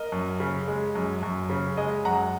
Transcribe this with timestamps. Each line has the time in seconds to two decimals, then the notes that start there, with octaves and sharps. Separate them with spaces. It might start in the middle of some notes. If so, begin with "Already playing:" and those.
Already playing: A#4 D#5
0.12 F#2
0.40 C#3
0.68 G#3
0.95 F#2
1.23 F#2
1.50 C#3
1.77 G#3 D#5 G#5
2.05 F#2 F#5 A#5